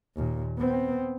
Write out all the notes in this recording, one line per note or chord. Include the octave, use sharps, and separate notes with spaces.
D#2 A#2
B3 C4